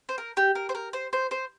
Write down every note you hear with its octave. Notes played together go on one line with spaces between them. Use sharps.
C5
A#4
G4
A#4
C5
A#4
C5
C5
C5